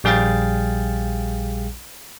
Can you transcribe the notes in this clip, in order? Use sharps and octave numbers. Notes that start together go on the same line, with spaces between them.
A#1 G3 G#4 F5 G5 A6